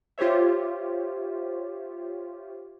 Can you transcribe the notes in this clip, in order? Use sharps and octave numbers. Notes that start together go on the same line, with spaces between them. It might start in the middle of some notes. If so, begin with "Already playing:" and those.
F4 G4 C5 C#5 E5